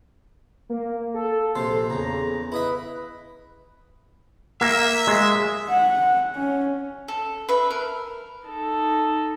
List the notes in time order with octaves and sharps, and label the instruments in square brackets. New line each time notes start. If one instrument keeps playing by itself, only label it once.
[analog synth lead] A#3
A4
[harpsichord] A#1 C3 A4 [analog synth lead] C6
[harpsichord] E2 C#3 [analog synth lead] A#5
[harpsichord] E4 D#5 E5 [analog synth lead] B4
[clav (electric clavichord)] A#3 [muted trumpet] E5
[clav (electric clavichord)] G#3
[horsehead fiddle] F#5
C#4
[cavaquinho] A4
B4 E5
A#4
[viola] D#4 A4